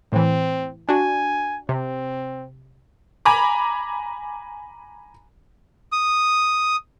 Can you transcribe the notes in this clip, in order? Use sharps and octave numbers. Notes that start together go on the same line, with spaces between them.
A2 E3 C4
D4 F#4 G#5
C3 C4
G#5 A#5 B5 D6
D#6